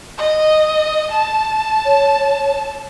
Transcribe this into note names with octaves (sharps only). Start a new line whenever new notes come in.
D#5
A5
C#5